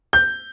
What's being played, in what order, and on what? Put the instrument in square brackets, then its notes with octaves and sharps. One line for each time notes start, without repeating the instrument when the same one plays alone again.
[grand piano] G6